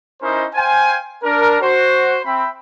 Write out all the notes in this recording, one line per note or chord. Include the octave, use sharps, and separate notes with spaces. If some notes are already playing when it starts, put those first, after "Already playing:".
C#4 D#4 E4 A#4 C5 D#5
C5 F5 G5 G#5
D4 A#4
F#4 C5
C4 E5 G5 B5